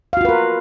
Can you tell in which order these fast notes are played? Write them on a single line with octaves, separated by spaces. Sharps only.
F5 F#4 F4 B4 A#4